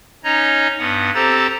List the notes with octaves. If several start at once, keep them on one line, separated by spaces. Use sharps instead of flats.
C#4 D#4 C#5 D#5 A#5
G2 B3 F#5
C4 G4 A4 C5 A#5 A6